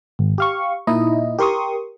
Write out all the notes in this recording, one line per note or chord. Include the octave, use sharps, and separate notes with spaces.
G#1
G4 F5 C#6
A#2 D#4 E4 D#5
G4 A#4 C6 C#6 D#6